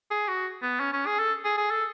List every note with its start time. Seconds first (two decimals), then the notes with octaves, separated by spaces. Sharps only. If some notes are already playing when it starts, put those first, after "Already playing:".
0.11 G#4
0.28 F#4
0.62 B3
0.80 C#4
0.93 C#4
1.06 G#4
1.19 A4
1.44 G#4
1.58 G#4
1.71 A4